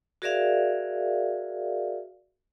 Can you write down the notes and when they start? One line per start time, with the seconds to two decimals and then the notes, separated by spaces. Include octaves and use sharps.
0.22 F#4 G#4 A#4 D5 E5 F5